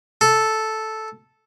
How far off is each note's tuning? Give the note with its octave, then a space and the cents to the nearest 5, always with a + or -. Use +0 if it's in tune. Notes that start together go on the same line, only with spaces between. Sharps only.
A4 -5